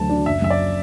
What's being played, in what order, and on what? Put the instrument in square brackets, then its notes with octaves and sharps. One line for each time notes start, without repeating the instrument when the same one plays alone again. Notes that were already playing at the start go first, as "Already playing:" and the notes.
Already playing: [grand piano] D2 D3 F#3 [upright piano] A5
[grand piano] D4
[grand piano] F#1 [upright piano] E5
[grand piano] F#2 [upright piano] E5
[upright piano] D5